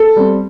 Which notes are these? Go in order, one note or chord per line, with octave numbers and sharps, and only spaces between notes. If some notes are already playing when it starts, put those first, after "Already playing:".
Already playing: A4
G3 C4